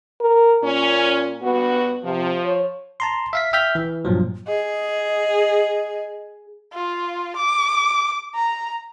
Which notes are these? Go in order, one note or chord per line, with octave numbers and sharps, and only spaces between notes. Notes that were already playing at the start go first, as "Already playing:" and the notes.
A#4
A#2 C#4
G2 B3 F#4
C3 F3
C#5
A5 A#5 C6
E5 F5 B6
E5 G5 F6 G6 B6
E3
G2 A#2 F3 F#3
G#4 D#5
F4
D6
A#5